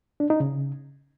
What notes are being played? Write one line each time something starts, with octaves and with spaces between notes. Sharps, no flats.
D4
D#4
C#3